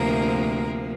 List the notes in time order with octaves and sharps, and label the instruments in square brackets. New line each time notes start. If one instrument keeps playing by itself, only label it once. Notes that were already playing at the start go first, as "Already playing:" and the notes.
Already playing: [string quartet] D2 C3 F3 A#3 A#4